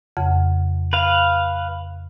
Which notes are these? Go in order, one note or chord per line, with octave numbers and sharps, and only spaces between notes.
F2 C#3 F#5
B4 F5